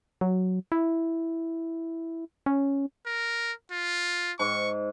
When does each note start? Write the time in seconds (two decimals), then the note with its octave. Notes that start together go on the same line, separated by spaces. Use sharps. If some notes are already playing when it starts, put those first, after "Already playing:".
0.21 F#3
0.72 E4
2.46 C#4
3.06 A#4
3.71 F4
4.39 G#2 C#6